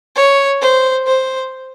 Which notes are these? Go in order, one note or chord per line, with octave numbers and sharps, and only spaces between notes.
C#5
C5
C5